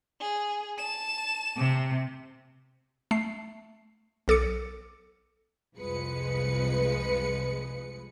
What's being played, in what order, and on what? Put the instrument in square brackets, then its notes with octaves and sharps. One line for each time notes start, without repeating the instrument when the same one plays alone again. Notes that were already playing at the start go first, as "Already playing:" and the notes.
[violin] G#4
A5 E7
[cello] C3
[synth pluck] A3 C7
B1 A4 D6 C#7
[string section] C2 F2 F3 G#3 B4 C#7